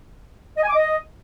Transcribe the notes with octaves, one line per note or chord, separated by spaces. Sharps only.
D#5
G#5
D6
D#5